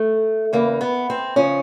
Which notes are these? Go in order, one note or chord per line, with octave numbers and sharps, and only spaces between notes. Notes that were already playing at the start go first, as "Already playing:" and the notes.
Already playing: A3
E2 C#3 E3 A#3
B3
C4
C#3 F3 C#4